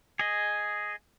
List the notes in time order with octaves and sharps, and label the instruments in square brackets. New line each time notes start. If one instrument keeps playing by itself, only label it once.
[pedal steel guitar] G#4 D#5